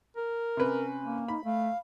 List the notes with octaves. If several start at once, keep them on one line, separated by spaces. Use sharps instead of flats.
A#4
C3 C#4 B4
A#3
D#4 B5
A3 F5